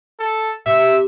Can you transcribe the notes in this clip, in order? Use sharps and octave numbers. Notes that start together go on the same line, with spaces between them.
A4
C3 E5